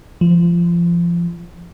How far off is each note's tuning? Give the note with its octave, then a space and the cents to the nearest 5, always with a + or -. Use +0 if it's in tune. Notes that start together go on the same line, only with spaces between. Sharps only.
F3 -25